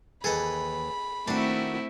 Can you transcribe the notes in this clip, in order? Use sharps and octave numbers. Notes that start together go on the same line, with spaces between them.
D#2 E3 G#4 A4 D#5 B5
D#3 A3 C4 D4 E4 F#4